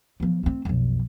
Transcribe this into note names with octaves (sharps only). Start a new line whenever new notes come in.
F3 B3
A3 C4
B1 F2